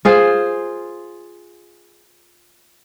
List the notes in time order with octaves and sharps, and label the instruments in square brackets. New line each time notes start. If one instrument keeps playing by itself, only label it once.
[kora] F4 G#4 C5 F5